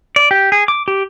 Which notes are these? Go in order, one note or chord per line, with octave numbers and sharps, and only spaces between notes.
D5
G4
G#4
D6
G4